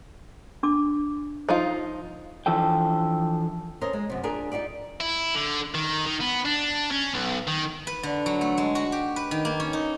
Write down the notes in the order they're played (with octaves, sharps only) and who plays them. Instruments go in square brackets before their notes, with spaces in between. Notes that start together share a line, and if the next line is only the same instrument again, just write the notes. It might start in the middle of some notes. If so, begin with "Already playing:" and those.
[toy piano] D4 D6
[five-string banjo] F3 D#4 F4
[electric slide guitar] E3 F3 D4 A4 G5
[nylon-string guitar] C#4 A4 A#4 C5 D#5
G#3
F#2 C3
D4 F4 G4 G#4 A#4
D#4 F4 G4 D5
[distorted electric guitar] E4
D3
D#3
D#3
B3
D4
C#4
B1
D#3
[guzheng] B4
D3
F#3
A3
G#3
F#4
G4
B4
D#3
A#3
C#4
D#4